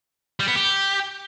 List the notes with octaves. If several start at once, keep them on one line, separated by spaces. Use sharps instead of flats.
G3
B3
G4